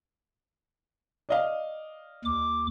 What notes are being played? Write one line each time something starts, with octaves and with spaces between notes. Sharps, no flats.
D5 D#5 F5
D#2 D6